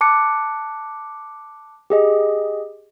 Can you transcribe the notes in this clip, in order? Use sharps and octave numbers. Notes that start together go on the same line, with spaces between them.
A5 D6 F#6 C#7
G4 G#4 D#5